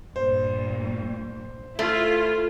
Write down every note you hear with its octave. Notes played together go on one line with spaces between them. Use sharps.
G2 A#2 C5
A3 E4 F4